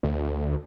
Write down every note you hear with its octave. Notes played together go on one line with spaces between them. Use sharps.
D2